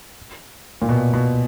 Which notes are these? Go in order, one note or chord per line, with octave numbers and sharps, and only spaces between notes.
A#2
B2
B2